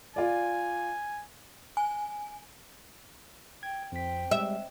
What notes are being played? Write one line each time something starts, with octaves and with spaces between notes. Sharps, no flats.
F4 D5 G#5
G#5
G5 G#6
F2 C4 G5 B6
G3 G#3 E5